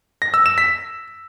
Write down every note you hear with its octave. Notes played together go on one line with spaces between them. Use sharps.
A#6
E6
E7
B6